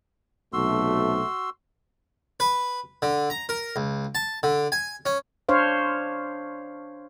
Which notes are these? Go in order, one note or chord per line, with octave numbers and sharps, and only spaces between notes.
B1 C3 A3 F#4 C6 E6
B4
D3
A#5
A#4
C#2
A5
D3
G#5
C#4
D4 C5 C#5 F5